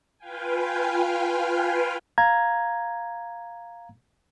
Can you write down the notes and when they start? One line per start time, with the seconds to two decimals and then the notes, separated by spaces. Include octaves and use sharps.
0.18 F4 B4 F5 G5 G#5
2.18 F5 A#5 G#6